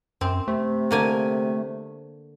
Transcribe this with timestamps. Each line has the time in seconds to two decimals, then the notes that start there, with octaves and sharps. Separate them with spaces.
0.21 F#2 C4
0.48 C3 A3
0.91 D3 A#3 G#5